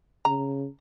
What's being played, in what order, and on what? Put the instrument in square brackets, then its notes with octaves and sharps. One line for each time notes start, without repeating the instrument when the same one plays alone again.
[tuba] C#3 [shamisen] A#5